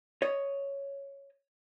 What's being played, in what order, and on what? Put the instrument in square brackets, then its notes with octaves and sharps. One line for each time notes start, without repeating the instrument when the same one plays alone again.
[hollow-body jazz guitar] C#5 D#5